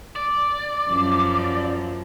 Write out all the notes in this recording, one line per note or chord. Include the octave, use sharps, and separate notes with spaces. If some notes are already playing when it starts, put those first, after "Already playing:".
D5
F#2 F3